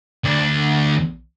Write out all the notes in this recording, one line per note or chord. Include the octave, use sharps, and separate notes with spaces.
D2 D4